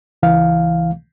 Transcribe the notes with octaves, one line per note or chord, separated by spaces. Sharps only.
C#2 E3 F5